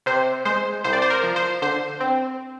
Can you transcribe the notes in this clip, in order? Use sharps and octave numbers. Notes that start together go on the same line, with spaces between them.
C3 C5
G#3 C5
C2 C5
D5
C5
A#4
F3
C5
D3 C5
C4